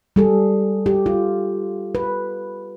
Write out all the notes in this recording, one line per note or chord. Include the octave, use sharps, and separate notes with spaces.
G3 G#4 A4
G4
F4
B4